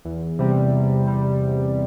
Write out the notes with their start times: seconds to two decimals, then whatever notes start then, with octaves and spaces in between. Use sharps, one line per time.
0.05 E2
0.39 C3 G3
0.72 E2
1.05 C3 G3
1.40 E2